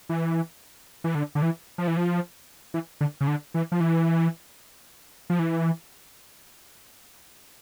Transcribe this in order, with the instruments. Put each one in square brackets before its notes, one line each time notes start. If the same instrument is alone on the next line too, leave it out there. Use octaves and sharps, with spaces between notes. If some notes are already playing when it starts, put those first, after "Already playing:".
[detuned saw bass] E3
E3
D3
D3
E3
F3
E3
F3
E3
D3
C#3
D3
E3
F3
E3
F3
E3